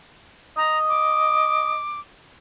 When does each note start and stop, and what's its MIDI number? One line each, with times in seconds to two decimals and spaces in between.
0.57 1.73 75
0.57 0.78 82
0.89 2.00 86